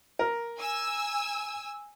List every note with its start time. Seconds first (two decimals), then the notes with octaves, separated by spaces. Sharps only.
0.19 A#4
0.61 G#5 E6